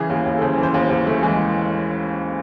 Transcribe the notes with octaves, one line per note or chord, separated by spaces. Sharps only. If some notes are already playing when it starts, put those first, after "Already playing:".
Already playing: C#3 E3 G#4
D#2
D#2
A4
C#3 C5
E3
C5
D#2
D#2
C#3 A3
E3 G#3